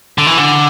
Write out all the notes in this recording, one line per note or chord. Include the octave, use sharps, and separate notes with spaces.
D3
E3
D3